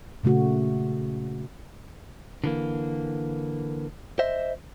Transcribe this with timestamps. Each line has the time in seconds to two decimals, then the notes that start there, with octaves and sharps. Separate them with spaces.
0.23 A#2 C#3 A3 F#4
2.44 D3 E3 A#3
4.19 C5 D#5 E5